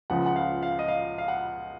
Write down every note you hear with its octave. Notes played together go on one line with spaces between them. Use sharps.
C#2 C#3 F3 F#5
F#5
F5
F5
D#5
F5
F5
F#5